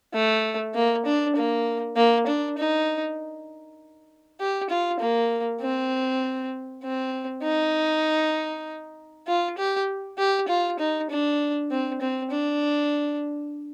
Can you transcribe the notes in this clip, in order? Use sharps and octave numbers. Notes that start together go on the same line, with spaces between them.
A3
A#3
D4
A#3
A#3
D4
D#4
G4
F4
A#3
C4
C4
D#4
F4
G4
G4
F4
D#4
D4
C4
C4
D4